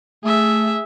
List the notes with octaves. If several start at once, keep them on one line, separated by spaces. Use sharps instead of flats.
A3 G#4 E5